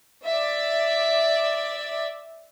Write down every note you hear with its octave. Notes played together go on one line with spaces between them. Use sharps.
D5 E5